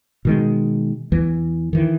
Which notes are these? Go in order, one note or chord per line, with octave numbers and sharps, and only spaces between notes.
B2 D#3 G#3
E2 E3
D#3 E3